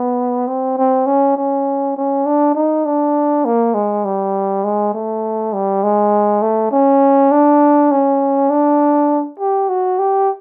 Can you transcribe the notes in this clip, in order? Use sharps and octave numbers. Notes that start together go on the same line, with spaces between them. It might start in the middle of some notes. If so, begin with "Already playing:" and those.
Already playing: B3
C4
C4
C#4
C#4
C#4
D4
D#4
D4
A#3
G#3
G3
G#3
A3
G3
G#3
A3
C#4
D4
C#4
D4
G4
F#4
G4